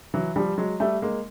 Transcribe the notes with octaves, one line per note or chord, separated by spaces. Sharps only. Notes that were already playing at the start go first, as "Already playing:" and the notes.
E3 F#3
F3 G3
F#3 G#3
G3 A3
G#3 A#3